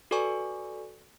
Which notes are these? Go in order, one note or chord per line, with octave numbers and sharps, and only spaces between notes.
F#4 A4 B4 D5 G#5 C#6